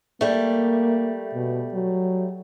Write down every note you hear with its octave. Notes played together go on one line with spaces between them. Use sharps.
G3 A3 A#3
B2
F#3